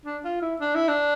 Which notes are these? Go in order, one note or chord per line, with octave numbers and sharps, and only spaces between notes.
D4
F4
E4
D4
E4
D4